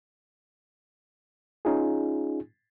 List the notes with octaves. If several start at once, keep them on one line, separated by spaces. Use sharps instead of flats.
C#4 D#4 F4 G#4